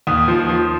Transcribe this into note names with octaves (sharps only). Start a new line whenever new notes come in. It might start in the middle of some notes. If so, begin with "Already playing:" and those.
D#2 D#6
F3
F3